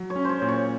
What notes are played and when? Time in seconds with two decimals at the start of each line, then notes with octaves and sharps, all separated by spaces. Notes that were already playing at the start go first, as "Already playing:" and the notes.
Already playing: F#3
0.10 C#5
0.16 C#4
0.24 C5 C#5
0.42 A#2
0.49 C#5